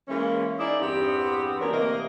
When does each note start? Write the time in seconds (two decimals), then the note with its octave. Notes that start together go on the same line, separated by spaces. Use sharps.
0.08 E3 G#3 A#3 C#4
0.59 D#4 E4 G#4 D5
0.81 E2 G2 B3 C4 G4
1.60 A#3 B3 C#4 D4 F#4 A#4
1.72 D2 C3 E3 A#3 A#4 D#5